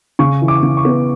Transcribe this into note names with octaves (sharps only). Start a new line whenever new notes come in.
C#3 C#6
E3
D6
C#3
C#6
B3